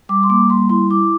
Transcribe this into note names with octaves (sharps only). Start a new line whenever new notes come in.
G3 D6
C6
A#3 D6
G3 C6
E4 C6
E4 D6